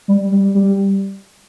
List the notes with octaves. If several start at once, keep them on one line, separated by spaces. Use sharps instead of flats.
G3
G3
G3